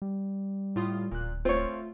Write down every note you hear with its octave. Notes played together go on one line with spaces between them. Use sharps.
G3
A2 F4 D#6
D1 A#2 F#6
A3 C4 F4 C#5